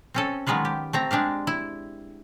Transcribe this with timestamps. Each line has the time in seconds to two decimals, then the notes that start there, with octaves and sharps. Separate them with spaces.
0.14 C4 C#4 A4
0.47 D#3 F#3 G#3 B3 F4 B4
0.65 G4
0.93 A3 C4 A#5
1.11 G#3 D4 G4 F5
1.47 E4